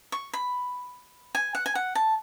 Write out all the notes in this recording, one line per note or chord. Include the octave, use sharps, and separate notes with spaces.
C#6
B5
G#5
F#5
G#5
F#5
A5